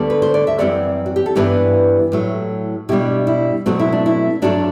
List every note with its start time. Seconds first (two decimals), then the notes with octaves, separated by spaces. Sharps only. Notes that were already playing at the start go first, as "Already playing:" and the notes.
Already playing: D2 D3 G3 B3 A4
0.10 B4
0.22 C5
0.34 D5
0.47 E5
0.59 F#2 E3 G3 C4 D5 F#5
1.06 F#4
1.16 G4
1.26 A4
1.35 G2 E3 B3 D4 G4 B4
2.12 A2 F#3 A3
2.89 B2 G3 D4 E4 G4
3.27 E4
3.66 B2 F#3 A3 C4 F#4
3.79 E4
3.92 D4
4.06 E4
4.42 G2 F#3 A3 D4 F#4